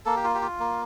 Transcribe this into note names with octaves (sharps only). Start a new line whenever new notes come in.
A#3 A4
G4
F4
G4
F4
A#3